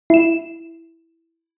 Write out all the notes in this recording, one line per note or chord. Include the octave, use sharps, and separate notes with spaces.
E4 E7